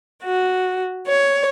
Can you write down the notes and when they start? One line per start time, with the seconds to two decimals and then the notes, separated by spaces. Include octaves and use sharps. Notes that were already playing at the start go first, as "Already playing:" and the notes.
0.23 F#4
1.07 C#5